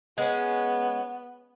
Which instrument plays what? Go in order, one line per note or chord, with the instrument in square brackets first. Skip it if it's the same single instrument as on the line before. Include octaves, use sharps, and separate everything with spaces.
[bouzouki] G#3 C#4 [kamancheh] B3